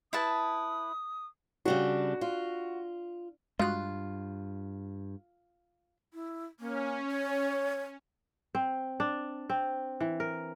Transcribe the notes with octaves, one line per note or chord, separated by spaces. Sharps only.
E4 B4 A5 D#6
C#3 G3 D4 F#4
F4
G2 G#3 F4 F#4 F#6
E4
A#3 C#4
C#5
C4
D4
C4
E3
A#4